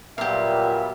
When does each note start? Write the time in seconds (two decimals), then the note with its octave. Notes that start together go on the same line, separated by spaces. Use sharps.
0.18 A#2 F#3 G3 B3 G4 E5 F5